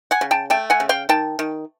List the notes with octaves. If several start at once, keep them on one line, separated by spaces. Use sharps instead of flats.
F#5 G#5
C#3
G5 A5
A3 G5 A5
F#5 G#5
C#3
F5 G5
D#3 G5 A5
D#3